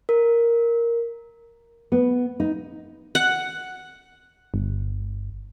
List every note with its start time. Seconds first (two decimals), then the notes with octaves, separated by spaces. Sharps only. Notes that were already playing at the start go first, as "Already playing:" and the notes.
0.09 A#4
1.92 B3
2.40 D#4
3.15 F#5
4.54 G1